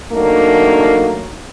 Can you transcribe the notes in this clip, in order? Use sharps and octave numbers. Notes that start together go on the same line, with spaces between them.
F#3 A3 A#3 D4 D#4